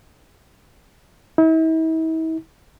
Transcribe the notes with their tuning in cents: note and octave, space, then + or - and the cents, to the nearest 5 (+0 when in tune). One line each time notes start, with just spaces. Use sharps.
E4 -45